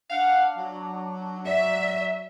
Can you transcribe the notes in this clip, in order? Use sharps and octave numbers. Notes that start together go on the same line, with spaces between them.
D4 F5 F#5
F#3
D5 E5